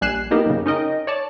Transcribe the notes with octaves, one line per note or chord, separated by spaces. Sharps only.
A#1 G3 G#5 F#6 C7 E7
A#3 B3 D#4 G4 A#4
F#2 C#3
C#4 D#4 A#4 D#5 G5
C#5 D5 A5